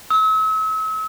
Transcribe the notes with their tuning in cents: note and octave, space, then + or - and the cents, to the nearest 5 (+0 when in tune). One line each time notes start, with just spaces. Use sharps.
E6 -40